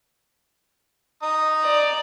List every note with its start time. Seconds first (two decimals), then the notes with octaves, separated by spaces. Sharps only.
1.23 D#4 A#5 D#6
1.64 D5